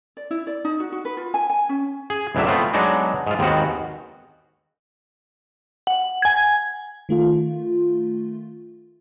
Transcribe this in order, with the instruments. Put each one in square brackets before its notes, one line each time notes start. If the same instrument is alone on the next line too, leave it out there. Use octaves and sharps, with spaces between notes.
[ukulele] D5
E4
D5
D#4
F#4
F#4
B4
F4
G#5
G#5
C#4
[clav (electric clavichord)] G#4
C#2 A2 F#3 D4 E5
A3 B3 C4 F4
F#3 G#3 B3 D4 D#4 F#4
G#2 F4
D#2 G#2 D#3 B3 C4 F#4
[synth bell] F#5
G#5 G#6
[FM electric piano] D#3 A3 F4